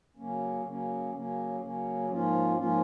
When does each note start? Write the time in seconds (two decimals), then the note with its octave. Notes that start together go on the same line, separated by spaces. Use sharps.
0.16 C#3 F#3 A#3 C#4
0.64 C#3 F#3 A#3 C#4
1.12 C#3 F#3 A#3 C#4
1.60 C#3 F#3 A#3 C#4
2.09 G#2 F3 A#3 C#4 F4
2.57 G#2 F3 A#3 C#4 F4